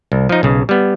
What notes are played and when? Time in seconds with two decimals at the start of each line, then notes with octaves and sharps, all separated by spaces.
0.12 C2
0.29 F3 D#4
0.43 B1 C#3
0.69 G3 B3